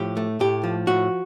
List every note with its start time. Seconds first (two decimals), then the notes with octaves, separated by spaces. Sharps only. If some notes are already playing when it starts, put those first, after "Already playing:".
Already playing: A2 F3 G4
0.17 A3
0.40 A2 G4
0.64 F3
0.87 A2 F#4